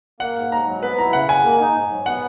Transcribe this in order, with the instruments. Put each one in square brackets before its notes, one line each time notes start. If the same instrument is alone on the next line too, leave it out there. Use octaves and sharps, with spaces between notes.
[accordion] A#3 [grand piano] F#5
[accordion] G#2
[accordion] G#2 [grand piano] A#5
[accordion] F#3
[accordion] B3 [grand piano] B4
[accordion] E4 [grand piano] A#5
[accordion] C#3 [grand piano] F#5
[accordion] G#3 [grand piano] G#5
[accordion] A#3
D#4
G#2
F#3
[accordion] B3 [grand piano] F#5